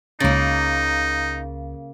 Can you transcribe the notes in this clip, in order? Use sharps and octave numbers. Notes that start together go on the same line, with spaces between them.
C#2 C#3 A#3 D#4 A6